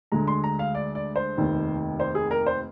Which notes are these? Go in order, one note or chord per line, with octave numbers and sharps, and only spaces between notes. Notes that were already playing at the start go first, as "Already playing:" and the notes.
D2 D3 G#3 A#5
C6
A#5
F5
D5
D5
C5
F1 D#2 D#3
C5
G#4
A#4
C5